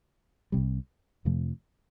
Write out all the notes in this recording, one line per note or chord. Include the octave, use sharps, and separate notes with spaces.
C2 C3 G3
F2 C3 F3 A3